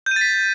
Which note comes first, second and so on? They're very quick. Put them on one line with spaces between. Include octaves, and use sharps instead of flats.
G6 D#7 A6 B6